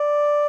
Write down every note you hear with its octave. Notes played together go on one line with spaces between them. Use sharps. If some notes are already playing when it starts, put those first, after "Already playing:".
Already playing: D5